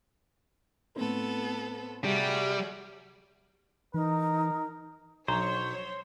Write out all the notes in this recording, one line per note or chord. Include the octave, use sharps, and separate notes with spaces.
A2 B3 C4 A4
C3 G3 F#4 G#4
E3 D#4 A#4
B1 F#3 D4 C5 C#5 A#5